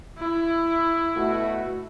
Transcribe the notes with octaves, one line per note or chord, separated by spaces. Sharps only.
E4
B2 A3 F#4